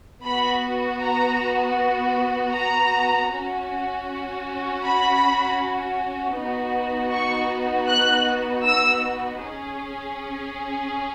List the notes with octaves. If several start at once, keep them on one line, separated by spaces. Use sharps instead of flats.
B3 F#4 B5
A#5
A#5
C#4 F#4
B5
B3 D#4 F#4
C#6
F#6
E6
C#4 G#4